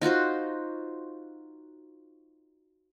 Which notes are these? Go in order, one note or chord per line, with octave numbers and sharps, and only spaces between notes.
D#4 F4 F#4 C5